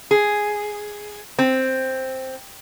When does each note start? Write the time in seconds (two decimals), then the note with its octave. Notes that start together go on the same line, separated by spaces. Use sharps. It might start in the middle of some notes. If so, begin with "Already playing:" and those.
0.11 G#4
1.39 C4